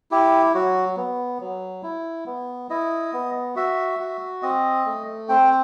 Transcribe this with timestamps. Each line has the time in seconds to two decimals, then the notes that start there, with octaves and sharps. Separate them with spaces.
0.11 E4 G4
0.54 F#3 F#4
0.97 B3
1.41 F#3
1.83 E4
2.26 B3
2.70 E4 D#5
3.13 B3
3.56 F#4 E5
3.99 F#4
4.42 C4 D#5
4.85 A3
5.29 C4 G5